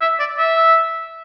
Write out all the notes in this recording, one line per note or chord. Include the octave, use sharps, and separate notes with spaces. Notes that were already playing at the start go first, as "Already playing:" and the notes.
E5
D5
E5